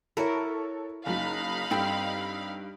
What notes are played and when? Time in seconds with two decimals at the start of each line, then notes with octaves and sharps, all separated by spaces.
0.17 E4 F#4 A4 A#4 C#5
1.06 F#1 F#3 D#4 F5 B5
1.71 G2 C4 A4 G5